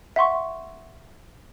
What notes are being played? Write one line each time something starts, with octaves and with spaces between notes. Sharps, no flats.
E5 F#5 C6 C#6